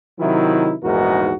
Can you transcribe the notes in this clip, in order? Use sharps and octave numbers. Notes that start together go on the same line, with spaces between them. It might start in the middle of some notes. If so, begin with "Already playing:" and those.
C3 D#3 F#3 D#4 E4
A#1 E2 G#2 D#4 F#4 A#4